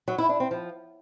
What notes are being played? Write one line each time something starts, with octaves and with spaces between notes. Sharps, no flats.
F#3
E4
D4
C4
F3